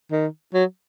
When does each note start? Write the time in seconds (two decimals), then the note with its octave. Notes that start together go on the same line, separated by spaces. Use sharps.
0.12 D#3
0.54 F#3